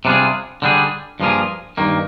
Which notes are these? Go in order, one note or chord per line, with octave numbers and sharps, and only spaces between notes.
C3 G3 D4 F4 G#4
D3 G3 D4 G#4
G2 F3 A#3 F4 G#4
G2 D#3 A#3